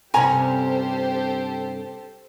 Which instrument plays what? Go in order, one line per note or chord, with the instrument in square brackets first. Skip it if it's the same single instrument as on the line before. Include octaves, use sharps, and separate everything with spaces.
[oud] G2 C3 C#4 [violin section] G4 A4 C5 [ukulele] G#5 A#5